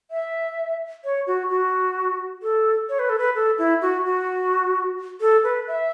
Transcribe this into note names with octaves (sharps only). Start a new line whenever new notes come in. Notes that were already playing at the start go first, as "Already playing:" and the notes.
E5
C#5
F#4
F#4
A4
C#5
B4
A4
B4
A4
E4
F#4
F#4
A4
B4
E5